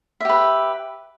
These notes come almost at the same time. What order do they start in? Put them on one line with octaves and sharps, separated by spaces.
E5 G4 B4